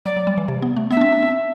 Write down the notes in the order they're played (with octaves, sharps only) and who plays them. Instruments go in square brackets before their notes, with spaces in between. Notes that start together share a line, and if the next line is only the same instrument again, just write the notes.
[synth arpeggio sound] F#3 [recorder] D5
[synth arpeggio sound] F#3
G3
E3
C3
B3
A3
[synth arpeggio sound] B3 [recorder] E5
[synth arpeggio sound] D4
C4
D4
C4